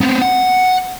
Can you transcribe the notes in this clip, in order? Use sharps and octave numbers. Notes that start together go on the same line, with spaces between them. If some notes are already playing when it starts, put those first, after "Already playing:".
B3 C4
F#5